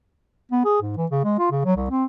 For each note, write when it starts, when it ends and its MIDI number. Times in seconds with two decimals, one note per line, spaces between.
0.52 0.63 59
0.65 0.80 68
0.82 0.94 44
0.97 1.06 52
1.11 1.22 49
1.24 1.38 56
1.39 1.48 65
1.51 1.61 49
1.65 1.76 54
1.77 1.87 36
1.90 2.05 60